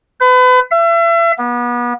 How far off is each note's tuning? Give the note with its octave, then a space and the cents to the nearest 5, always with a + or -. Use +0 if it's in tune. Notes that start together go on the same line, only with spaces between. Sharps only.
B4 +35
E5 +35
B3 -35